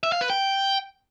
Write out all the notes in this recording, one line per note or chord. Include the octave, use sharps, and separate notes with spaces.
E5
F5
B4
G5